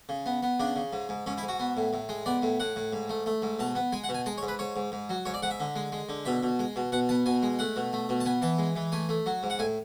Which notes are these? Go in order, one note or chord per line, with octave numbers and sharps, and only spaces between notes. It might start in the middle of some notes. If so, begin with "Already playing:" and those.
C#3
B3
B3
C#3 D4
C#3
G#2
G#2
G#2 C#4
E4
G#2
F#4
B3
A2
A2
G#3
B3 D5
A2
A2 F#5
A2
G#2
A3
A3
G#2
B2 A5
B3
G#3 G#5
F#5
B2
G#5
G#3 A5
C#5
G#2
B4
G#2 C#5
G#2
G#2
F#3
G#2 C#5
D5
G#2 F#5
E5
D3
G#3
G#3
D3
B2 E5
B2
G#3
B2
B2 F#5
B3 A5
B2 G#5
G#3
A3 F#5
B2
A3
B2
A5
B3 G#5
E3 A5
G#3
E3
A3 G#5
A3
F#3
G#2
F#5
A2 G#5